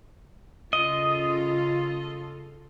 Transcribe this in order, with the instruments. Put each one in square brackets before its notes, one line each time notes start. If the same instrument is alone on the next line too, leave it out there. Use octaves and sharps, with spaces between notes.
[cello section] C#3 F4 A4 [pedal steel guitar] D#5